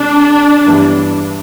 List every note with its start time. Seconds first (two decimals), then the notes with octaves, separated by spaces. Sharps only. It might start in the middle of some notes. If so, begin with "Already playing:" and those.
Already playing: C3 G#3 D4
0.66 G2 E3 G3 B3